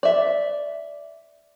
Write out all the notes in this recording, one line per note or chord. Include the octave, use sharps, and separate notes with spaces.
D5 E5